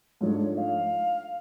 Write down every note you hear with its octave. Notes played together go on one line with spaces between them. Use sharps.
G#2 F3 A3 D4 C#5
C#5
F5